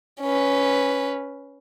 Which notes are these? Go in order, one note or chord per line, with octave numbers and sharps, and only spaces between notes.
C#4 B4